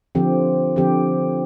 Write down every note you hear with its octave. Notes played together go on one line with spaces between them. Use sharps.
D3 F3 C4 G4
D3 F3 C4 G4